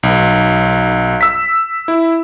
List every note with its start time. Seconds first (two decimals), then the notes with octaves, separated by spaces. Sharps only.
0.03 B1
1.21 E6 B6
1.88 E4